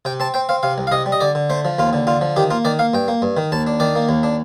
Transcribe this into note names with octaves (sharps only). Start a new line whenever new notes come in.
C3 G5
C4 A5
C4 G5
C4 F5
C3 F5
C2
F5
C3 D#5
G3
D#5
D3 D5
D3
A3 C5
F3
D#2 F4
D3
D3 F4
F3
D#3 G4
A#3 F4
D#3 D5
A#3 F5
G2 G5
A#3
G2
D#3
D#2 A5
D4
D#3 D5
A#3
D#2
D4